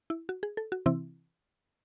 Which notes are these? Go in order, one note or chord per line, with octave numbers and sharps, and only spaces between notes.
E4
F#4
G#4
A4
F#4
C3 E3 C4 E4